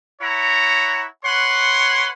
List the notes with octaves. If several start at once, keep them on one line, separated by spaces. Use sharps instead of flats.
E4 C#5 F#5 A#5
B4 C#5 F#5 C6